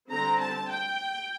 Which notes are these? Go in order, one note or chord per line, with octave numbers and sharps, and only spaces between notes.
D3 G3 C4 A#5
A5
G5